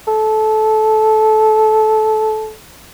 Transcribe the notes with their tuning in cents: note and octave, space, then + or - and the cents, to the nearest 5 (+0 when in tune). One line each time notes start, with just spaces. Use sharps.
A4 -20